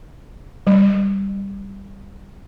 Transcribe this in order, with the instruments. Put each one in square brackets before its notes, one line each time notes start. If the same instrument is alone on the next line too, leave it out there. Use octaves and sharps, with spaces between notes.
[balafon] G3